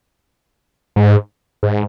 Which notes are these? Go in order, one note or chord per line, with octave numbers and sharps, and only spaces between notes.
G#2
G#2